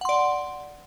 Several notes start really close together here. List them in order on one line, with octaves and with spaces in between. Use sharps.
F#5 C6 D5